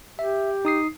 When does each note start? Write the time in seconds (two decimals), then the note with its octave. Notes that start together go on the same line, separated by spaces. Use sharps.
0.19 G4 E5
0.65 D#4 D#6 C7